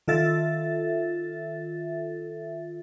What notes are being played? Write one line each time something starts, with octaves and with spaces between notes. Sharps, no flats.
D#3 F4 A4 E5 A6